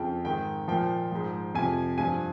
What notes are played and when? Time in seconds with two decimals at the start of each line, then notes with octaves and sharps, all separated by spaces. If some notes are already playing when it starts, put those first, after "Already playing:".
Already playing: F2 C#3 F3 G5
0.25 G#2 D#3 G5
0.68 A#2 F3 G5
1.12 G#2 F3
1.55 F2 C3 F3 G#5
1.98 G2 F3 G#5